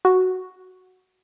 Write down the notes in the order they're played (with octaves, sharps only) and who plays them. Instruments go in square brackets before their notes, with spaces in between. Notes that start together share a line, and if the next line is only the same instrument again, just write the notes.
[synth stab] F#4